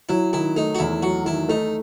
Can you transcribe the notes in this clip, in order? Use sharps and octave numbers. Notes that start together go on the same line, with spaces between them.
F#3 E4
D#3 E4
A3 D#4
F#4
E2 E4
F#3 F#4
D#3 E4
A3 D#4